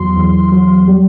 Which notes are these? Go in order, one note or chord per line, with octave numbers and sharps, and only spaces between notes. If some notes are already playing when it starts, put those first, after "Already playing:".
Already playing: E2 F#3 C6
E2
F#3
G3